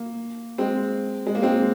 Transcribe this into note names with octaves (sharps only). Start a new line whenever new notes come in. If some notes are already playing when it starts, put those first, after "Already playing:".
Already playing: A#3
G#3 C4
G#3
A#3
G#3 C4